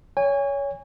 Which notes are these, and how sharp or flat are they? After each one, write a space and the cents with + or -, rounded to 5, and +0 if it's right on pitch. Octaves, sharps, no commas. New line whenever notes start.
C#5 +20 G#5 -30